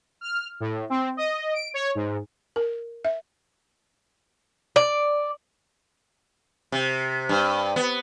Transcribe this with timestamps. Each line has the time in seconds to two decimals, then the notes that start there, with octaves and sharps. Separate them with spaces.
0.21 F6
0.60 A2
0.90 C4
1.17 D#5
1.54 D7
1.74 C#5
1.95 G#2
2.56 A#4
3.05 E5
4.76 D5
6.72 C3
7.29 G2
7.76 B3